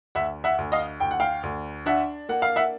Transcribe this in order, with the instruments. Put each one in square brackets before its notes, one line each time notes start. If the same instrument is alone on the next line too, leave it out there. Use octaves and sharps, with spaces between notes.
[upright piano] D2 E5 F#5
E5 F#5
D2
D#5 F5
D2 G5
F#5
F5 G5
D2
D4 E5 F#5
A#3 F#5
F5
E5 F#5